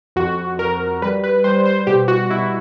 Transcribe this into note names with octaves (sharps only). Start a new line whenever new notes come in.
F2 F#4
F2 A#4
G3 B4
B4
G3 C5
C5
B2 G4
F#4
B2 E4